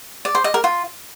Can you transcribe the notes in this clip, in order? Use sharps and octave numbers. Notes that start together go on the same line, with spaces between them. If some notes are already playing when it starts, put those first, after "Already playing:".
D5
C5
D#5
A#4
F4